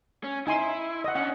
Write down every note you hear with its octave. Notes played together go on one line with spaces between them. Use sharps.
C#4
D#4 E4 G#5 C6
D#5 F#5
C#4 D4 F#5